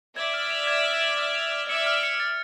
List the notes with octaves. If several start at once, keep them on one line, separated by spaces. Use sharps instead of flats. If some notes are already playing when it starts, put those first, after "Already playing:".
D5 E5 G#6
F6
F7
G#6
F6
F7
F6
F7
F6
D5 E5 C#7
F6
C#7
A6